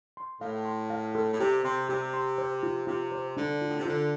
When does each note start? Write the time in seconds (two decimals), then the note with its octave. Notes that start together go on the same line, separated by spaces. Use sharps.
0.17 C6
0.41 A2 F5
0.65 C6
0.90 F5
1.15 A4
1.33 A2
1.40 C3 G4
1.64 C3 C6
1.89 C3 G4
2.14 C6
2.38 C5
2.63 F4
2.87 C3 F4
3.12 C5
3.37 D3 D4
3.61 F4
3.70 A2
3.78 C3
3.86 D3 F4